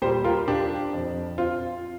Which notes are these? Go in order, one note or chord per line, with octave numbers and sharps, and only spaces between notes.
A#2 G3 G4 C5
F4 A#4
D4 G4
F2 F3
C4 F4